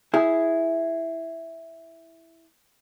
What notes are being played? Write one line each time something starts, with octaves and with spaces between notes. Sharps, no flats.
E4 G#4